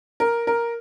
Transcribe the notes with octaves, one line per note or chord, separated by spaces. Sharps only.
A#4
A#4